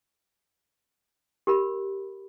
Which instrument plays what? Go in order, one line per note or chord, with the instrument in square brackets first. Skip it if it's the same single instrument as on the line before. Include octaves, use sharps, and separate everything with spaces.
[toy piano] G4 A#4 B5